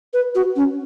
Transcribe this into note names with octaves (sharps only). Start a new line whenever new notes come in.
B4
F#4
C#4